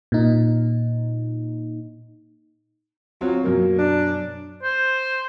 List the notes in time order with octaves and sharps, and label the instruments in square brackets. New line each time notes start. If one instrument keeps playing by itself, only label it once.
[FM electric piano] A#2 D#4
[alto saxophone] F#3 [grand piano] C4 F4 C#5
[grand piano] F#2 B2 [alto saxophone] A#3
[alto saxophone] D4
[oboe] C5